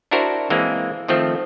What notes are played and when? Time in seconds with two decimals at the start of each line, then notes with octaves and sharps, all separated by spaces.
0.11 D4 E4 F#4 A#4 C5
0.50 E3 G#3 A#3 C4
1.08 D#3 F3 A3 C4